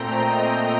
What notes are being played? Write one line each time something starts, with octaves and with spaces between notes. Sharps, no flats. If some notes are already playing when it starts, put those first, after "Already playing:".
Already playing: A#2 A3 C4 G5 A#5
D#5 G5